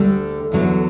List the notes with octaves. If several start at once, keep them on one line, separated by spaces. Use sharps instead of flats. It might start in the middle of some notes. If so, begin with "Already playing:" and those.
Already playing: D2 D3 G3 A4
E2 D3 F#3